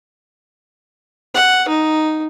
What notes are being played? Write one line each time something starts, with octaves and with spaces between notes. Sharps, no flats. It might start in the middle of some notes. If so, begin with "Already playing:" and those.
F#5
D#4